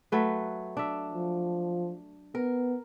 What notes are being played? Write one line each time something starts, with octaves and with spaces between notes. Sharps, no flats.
F#3 A3 B4
D4 E5
F3
B3 A#4